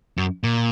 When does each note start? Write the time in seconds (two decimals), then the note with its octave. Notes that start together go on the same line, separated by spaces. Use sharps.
0.18 F#2
0.44 A#2